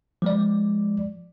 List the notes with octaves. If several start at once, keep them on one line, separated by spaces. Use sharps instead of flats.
F3 G#3 D5